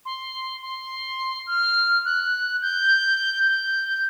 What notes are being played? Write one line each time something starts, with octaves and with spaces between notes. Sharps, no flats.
C6
C6
F6
F#6
G6
G6